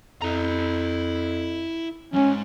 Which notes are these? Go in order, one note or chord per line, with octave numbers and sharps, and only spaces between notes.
F2 E4 A#5
F2 G#2 C#4